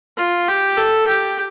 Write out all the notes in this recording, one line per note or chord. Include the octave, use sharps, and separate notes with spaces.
F4
G4
A4
G4